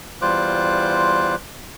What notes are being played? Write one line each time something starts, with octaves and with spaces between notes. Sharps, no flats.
E2 G3 F4 C5 D6 F#6